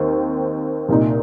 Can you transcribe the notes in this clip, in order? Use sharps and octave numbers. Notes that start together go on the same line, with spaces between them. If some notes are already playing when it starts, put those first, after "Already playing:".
Already playing: D#2 D#3 C4
C2 A#2 A#3 D#4